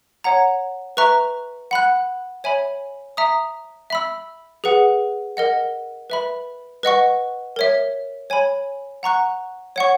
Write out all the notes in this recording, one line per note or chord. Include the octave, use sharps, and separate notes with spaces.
C#5 F#5 A#5
B4 E5 A#5 C#6 F#6
F#5 B5 F#6
C#5 E5 G#5 B5
E5 A#5 D#6
E5 B5 E6
G#4 B4 F#5
A#4 D#5 F#5
B4 E5 B5
B4 D#5 F#5 C#6
A#4 C#5 E5
C#5 G#5 B5
F#5 A#5 C#6 F#6
C#5 F#5 C#6